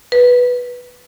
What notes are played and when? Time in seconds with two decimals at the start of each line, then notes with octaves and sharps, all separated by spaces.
0.12 B4